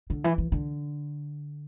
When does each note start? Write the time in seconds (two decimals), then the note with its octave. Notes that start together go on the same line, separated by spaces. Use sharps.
0.10 D3
0.24 E3
0.38 E3
0.52 D3